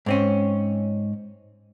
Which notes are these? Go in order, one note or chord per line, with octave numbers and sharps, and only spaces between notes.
G#2 C4 C#4